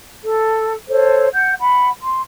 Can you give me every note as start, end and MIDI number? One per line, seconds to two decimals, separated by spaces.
0.24 0.72 69
0.88 1.26 69
0.88 1.26 72
0.88 1.26 73
1.32 1.52 78
1.32 1.52 91
1.57 1.88 78
1.57 1.88 83
2.00 2.18 84